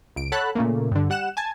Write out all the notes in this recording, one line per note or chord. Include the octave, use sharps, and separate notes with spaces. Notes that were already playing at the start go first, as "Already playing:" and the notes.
C#2 D7
A4 C#5 F#5 A5 B5 F#6
A#2 C#3 A3 A#3
G2 D3
G3 F#5 F#6 E7
G#5 A5 G#6